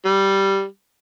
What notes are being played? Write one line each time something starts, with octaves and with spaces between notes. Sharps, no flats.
G3